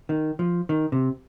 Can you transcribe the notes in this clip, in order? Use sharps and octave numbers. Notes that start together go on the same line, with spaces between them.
D#3
F3
D#3
C3